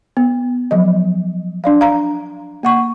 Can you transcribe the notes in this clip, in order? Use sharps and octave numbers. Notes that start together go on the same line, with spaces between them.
B3
F3 F#3 D#5
D4 D5 F5
F5 A#5
A#3 F#5 C#6